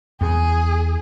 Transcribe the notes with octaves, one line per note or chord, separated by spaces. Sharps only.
E2 G#4